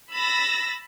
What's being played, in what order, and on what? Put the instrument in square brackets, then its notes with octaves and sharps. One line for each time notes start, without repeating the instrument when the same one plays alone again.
[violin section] B5 E6 A6 A#6